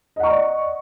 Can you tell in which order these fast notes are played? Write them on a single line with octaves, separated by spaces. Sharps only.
D#5 F#5 C#6 D5